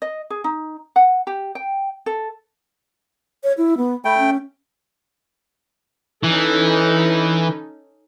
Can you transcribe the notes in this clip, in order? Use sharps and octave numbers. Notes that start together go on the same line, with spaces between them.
D#5
G#4
D#4
F#5
G4
G5
A4
C#5
E4
B3
A3 G5 B5
C#4
E3 C#4 D#4 A4